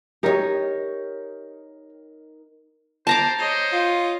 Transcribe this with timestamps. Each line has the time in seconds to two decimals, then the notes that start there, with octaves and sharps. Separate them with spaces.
0.23 D#4 G4 A#4 C#5 D#5
3.07 C5 A5 A#5 D6
3.39 C5 C#5 D#5
3.72 F4